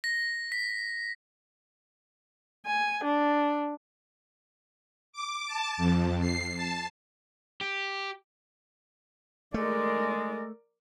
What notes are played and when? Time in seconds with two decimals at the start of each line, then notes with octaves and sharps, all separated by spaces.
0.04 A#6
0.52 B6
2.66 G#5
3.04 D4
5.13 D6
5.47 A5
5.78 F2
6.20 C7
6.56 A5
7.61 G4
9.54 G#3 A3 A#4 D5